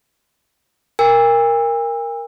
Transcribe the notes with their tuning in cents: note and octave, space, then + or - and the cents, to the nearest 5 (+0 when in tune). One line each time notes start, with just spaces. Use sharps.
A#4 +0 G#5 -45 E6 +5